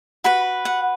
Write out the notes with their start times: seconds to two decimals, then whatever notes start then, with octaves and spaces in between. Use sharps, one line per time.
0.24 F#4 B4 B5
0.65 F#5